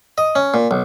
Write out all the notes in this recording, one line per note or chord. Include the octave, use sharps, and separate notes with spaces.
D#5
C#4
A#2
B1